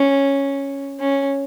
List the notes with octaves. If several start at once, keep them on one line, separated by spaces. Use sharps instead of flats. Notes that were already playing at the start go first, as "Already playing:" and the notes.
Already playing: C#4
C#4